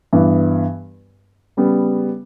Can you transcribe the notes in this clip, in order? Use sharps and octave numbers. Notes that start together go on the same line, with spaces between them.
G2 E3 B3
C#3 G3 B3